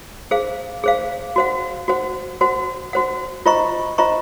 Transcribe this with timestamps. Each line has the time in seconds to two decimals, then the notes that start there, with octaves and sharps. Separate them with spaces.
0.31 G#4 C5 F5
0.84 G#4 C5 F5
1.36 F#4 C5 F#5
1.88 F#4 C5 F#5
2.41 F#4 C5 F#5
2.93 F#4 C5 F#5
3.46 F4 C5 D#5 A#5 C#6
3.98 F4 C5 D#5 A#5 C#6